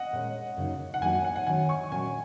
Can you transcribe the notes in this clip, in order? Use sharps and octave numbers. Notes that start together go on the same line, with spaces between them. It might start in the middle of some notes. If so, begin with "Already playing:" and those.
Already playing: D#5 F#5
A#2 G#3 C#4
F#2 C#3 A#3 D#4
F#5
F#2 F#3 A#3 D#4 G#5
F#5
F#5
F#5
D#3 F#3 C#4 G#5
C#6
A#2 F#3 C#4 G#5